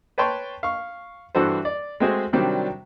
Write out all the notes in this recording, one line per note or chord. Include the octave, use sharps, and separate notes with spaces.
B4 C#5 G5 A5 C6 C#6
F5 C#6
G2 E3 F#4 A4 C5
D5
G#3 A3 C4 F#4 G#4 C5
C3 D#3 F#3 G3 C4 D4